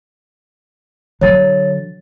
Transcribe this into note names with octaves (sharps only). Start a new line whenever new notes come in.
D3 F#3 C#5 A6